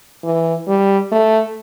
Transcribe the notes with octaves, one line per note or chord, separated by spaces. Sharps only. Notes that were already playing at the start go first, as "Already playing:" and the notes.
E3
G3
A3